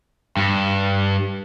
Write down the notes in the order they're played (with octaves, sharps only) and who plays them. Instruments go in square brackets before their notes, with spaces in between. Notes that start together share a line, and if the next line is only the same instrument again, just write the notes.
[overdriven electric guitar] G2